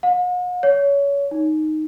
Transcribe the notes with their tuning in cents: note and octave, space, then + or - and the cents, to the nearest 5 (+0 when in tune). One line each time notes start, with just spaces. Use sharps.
F#5 -45
C#5 +25
D#4 -5